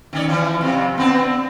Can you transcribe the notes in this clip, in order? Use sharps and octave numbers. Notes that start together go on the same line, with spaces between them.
D#3 C#4 D5
E3 F3
F2 C3
B3 C4 D4